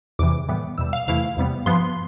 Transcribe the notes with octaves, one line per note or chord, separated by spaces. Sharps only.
E2 C3 E3 D6
A2 E3 G3 B3
E2 B2 G3 E6
F5
E2 C3 E3 A3 E4 F5
E2 C3 G3 B3
G2 F3 B3 C6